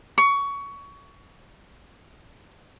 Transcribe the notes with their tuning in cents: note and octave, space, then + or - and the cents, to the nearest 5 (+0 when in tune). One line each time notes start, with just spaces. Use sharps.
C#6 +20